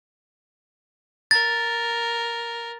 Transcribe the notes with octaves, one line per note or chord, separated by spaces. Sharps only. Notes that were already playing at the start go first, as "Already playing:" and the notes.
A#4 A6